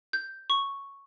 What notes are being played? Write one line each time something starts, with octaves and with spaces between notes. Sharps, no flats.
G6
C#6